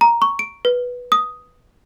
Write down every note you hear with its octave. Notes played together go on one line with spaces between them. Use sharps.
A#5
C#6
D7
B4
D#6